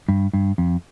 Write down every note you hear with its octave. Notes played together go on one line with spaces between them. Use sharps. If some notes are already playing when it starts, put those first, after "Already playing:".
G2
G2
F2